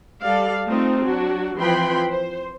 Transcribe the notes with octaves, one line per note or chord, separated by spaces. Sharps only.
G3 A4 D5 F5
A3 C4 D#4 F4
F#3 D4 F#4
E3 F3 C4 G5 B5 C6
C5